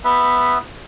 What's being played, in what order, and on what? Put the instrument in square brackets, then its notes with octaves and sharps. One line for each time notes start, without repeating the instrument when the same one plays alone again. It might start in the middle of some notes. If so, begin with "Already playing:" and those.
[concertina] B3 B4 E5